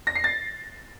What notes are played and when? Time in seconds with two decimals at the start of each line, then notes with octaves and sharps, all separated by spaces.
0.07 A#6
0.15 C7
0.24 A6